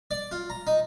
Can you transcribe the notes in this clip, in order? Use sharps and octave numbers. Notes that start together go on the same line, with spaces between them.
D5
F4
A#5
D#4